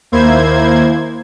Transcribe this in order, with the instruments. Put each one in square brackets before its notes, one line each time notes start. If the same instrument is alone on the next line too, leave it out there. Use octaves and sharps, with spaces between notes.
[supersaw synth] D#2 A#3 E4 C5 G#6